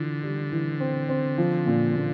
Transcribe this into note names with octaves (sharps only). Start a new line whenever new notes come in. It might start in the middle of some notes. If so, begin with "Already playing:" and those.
Already playing: D3 E3 F4
G3
E3
C4
C4
F3
A#2
A#2